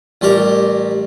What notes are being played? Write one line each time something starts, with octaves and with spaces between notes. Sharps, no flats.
A1 G3 G4 A#4